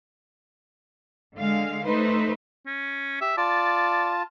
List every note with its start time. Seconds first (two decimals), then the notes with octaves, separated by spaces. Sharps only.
1.36 D3 G#3 F5
1.85 A3 D#4 B4 C5
2.67 C#4
3.21 G4 E5
3.37 F4 D5 A5